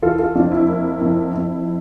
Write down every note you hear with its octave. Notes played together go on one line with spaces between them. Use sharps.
E3 F4 A4
F4 A4
F2 D4 F4
E4
A#3
F2
F2